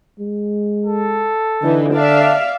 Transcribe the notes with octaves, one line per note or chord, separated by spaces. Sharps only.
G#3
A4
D3 E3 D#4
D4 D5 E5 F5